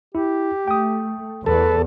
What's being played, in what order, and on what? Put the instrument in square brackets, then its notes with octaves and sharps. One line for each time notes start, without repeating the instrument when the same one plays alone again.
[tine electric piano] E4 [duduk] G4
[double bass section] A3 [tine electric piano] G5 D#6
[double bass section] E2 [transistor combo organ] A4 [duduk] B4